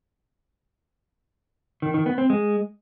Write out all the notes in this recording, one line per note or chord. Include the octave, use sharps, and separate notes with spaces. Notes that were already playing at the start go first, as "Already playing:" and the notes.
D#3
D#3
B3
C4
G#3